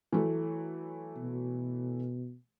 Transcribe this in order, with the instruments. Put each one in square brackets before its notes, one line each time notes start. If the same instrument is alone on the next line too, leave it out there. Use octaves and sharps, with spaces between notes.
[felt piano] E3 F#3 A3
[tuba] B2